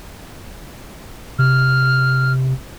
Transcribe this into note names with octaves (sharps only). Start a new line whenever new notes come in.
C3 F6